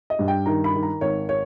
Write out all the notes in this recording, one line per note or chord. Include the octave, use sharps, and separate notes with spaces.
D#5
G2
G5
D#3 A#5
B5
D#3
A#5
G#1 C#5
C#5